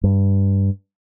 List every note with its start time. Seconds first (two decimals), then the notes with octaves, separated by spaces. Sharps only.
0.04 G2